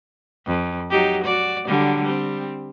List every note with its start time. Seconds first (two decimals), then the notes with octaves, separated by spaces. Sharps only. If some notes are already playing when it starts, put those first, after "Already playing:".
0.46 F2
0.90 F#3 D#4 G4
1.24 F#4 D5
1.67 D3 F#3 G3
2.03 G3 C4